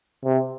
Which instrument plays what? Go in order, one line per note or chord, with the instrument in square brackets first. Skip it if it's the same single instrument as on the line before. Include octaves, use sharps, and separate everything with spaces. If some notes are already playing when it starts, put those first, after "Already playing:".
[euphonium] C3